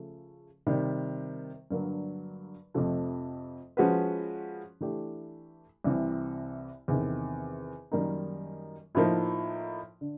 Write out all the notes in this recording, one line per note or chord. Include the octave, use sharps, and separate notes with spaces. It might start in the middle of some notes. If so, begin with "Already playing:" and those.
Already playing: C#3 F3 A3
C3 D#3 G3
G2 D3 F#3 A#3
F2 C3 F3 A3
F3 G#3 C#4 F#4 B4
E3 A3 D4 G4
C2 C3 E3
E2 C3 D#3
F#2 D#3 G3 A#3 D#4
A2 F3 A#3 D#4
D3